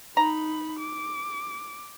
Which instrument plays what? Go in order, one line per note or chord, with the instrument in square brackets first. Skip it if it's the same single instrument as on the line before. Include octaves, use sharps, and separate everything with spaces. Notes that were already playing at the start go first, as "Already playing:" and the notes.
[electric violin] D#4 B5 [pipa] A#5
[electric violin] D6